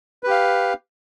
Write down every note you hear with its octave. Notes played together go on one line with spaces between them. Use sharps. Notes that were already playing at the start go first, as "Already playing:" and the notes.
G4 B4 F5